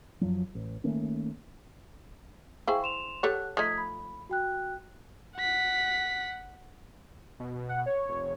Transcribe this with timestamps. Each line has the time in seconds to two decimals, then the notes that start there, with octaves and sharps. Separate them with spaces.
0.21 F#2 F3 F#3
0.55 A1
0.84 D#3 A3 A#3 C#4
2.67 E4 G#4 C5 F5 G5 C#6
2.83 C6 E7 F7
3.23 G4 A4 C#5 F#5 F#6
3.57 F3 A3 D#4 D#6 G#6 B6
3.78 B5
4.29 F#4 G5 F#6
5.36 F#5 B6
7.40 B2
7.69 F#5
7.86 C#5
8.09 F1